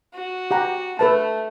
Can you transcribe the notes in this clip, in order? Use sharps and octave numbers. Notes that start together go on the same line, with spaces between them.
F#4
G4 F#5 A#5
A3 A4 B4 A5